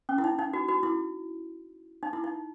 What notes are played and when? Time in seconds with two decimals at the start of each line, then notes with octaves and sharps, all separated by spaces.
0.09 C#4
0.18 E4
0.24 D#4
0.39 D#4
0.53 F#4
0.68 F#4
0.83 E4
2.03 D#4
2.13 E4
2.24 D#4